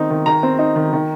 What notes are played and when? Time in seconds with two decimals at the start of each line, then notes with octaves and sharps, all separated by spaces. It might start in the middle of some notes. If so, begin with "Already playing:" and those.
Already playing: D#3 C4 D#4
0.10 D#3
0.26 D#3 A#5
0.43 C4
0.59 D#4
0.76 D#3
0.93 D#3